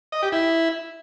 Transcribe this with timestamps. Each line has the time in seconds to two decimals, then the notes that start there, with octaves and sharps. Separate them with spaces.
0.12 D#5
0.22 G4
0.32 E4